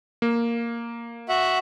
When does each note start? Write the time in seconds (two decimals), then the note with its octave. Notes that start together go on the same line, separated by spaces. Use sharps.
0.22 A#3
1.29 F#4 E5 F#5